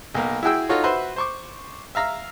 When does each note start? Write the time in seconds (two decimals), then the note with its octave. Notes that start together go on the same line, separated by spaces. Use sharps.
0.15 B1 A#3
0.43 E4 F#4 G#4 G5 E6
0.69 D#4 F4 F#4 A4 C#5
0.84 F#4 B4 C5 E5
1.16 C5 C#6 D6
1.95 E5 F5 A#5 E6